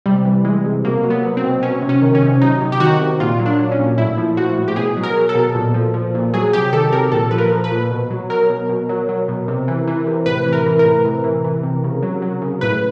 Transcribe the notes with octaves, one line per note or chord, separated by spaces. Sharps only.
C3 G3
E3
E3 G#3
C3
B2 A#3
F#3
B3
F#3
C4
B2
F#3 C#4
C3
C#4
D#3
C#4
C3
F#3 D#4
C3
G4
D#3 F#4
C3
A#2 F4
F#3
D4
F#3
C#4
A#2
A2 E4
F3
F3 F#4
A2
G4
B2 G#4
F#3
A#4
F#3
A4
B2
A#2
F3
F3
A#2
F#3 G#4
C3 G4
D#3 A4
C3 A#4
A#2 A4
F3 B4
A#4
F3
B4
A#2
B2
F#3
F#3 A#4
B2
B2
F#3
F#3
B2
C3
E3
E3
C3
A2 B4
E3
A#4
E3
A#4
A2
C3
E3
E3
C3
C#3
F#3
F#3
C#3
A2 B4